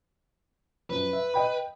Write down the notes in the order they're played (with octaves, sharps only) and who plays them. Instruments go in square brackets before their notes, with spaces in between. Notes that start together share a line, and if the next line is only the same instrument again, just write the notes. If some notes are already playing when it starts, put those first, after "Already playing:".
[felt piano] F#2 F3 [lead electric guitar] B4
[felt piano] E5
D#5 G5 B5